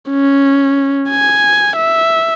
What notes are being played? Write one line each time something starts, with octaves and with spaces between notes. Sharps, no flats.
C#4
G#5
E5